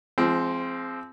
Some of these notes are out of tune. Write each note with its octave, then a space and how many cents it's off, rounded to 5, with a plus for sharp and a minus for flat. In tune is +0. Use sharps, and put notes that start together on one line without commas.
F3 -30 G#3 +15 C4 +0